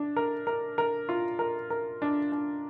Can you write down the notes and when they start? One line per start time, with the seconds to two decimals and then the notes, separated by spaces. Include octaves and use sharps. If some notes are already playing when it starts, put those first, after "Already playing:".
Already playing: D4
0.16 A#4
0.47 A#4
0.78 A#4
1.09 F4
1.39 A#4
1.70 A#4
2.02 D4
2.32 D4